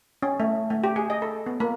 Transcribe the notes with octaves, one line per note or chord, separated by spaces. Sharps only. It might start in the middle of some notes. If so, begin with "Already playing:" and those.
C#4
A3
A3
G4
G#4
D#5
A4
B3
A#3